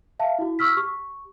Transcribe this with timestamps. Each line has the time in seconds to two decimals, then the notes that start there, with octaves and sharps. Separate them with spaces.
0.19 E5 F5 A5
0.39 E4 F#4
0.59 C#6 E6 F6 B6
0.77 G4 C#6